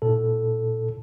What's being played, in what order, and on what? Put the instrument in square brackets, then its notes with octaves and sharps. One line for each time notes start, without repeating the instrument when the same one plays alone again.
[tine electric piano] A#2 A4